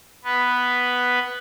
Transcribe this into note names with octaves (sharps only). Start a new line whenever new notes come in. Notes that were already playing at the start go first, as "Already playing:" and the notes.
B3 B4